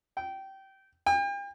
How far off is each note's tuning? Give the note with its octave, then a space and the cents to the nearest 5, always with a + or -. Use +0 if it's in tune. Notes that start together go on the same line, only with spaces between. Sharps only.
G5 -20
G5 +40